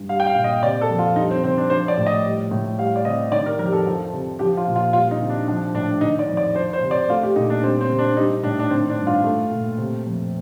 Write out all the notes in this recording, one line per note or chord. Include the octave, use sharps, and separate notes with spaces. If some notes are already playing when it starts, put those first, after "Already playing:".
Already playing: G2
G3 F5
G5
F5
A#2
D#5
C3 D5
A4
F2
F4
G3 D#4
C4
C3 C4
D4
F3 C5
D5
A2
D#5
G3
A2
G3 F5
D5
C3 D#5
D#3 D5
A#4
F2 A#4
G4
A4
F3
C3
F3 G4
F4
A#2
F4
G3 F4
D#4
C3
D4
F3 D4
A2 D4
D#3 D#4
D5
F2
D5
F3 C5
C5
C3
D5
A3 F4
G4
A#2 D#4
D4
G3 C4
C4
C3
D4
G3 D#4
A2 D4
D4
D#3 C4
D4
G2
F4
A3
A#2
C3
F2